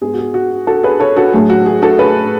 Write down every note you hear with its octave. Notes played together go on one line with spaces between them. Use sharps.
G#2 G#3 B3 G#4
F#4
G#4
F#4
F#4 A4
G#4 B4
A4 C#5
F#4 A4
A2 F#3 A3 G#4
F#4
G#4
F#4 A4
G#4 B4